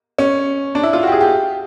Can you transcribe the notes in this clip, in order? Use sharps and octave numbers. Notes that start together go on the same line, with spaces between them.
C#4
D4
E4
F4
F#4
G4
G#4
G4